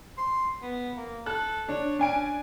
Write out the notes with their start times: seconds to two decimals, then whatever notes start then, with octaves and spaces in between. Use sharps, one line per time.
0.18 C6
0.62 B3
0.97 A#3
1.26 A4 F#6
1.69 D4 C#5
1.99 C#4 D4 G#5 D7